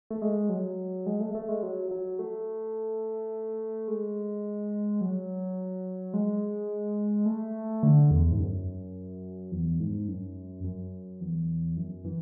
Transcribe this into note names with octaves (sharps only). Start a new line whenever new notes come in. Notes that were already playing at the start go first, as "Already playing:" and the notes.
A3
G#3
F#3
G#3
A3
A3
G#3
F#3
F#3
A3
G#3
F#3
G#3
A3
D3
E2
G#2
F#2
E2
G#2
F#2
F#2
E2
F#2
E3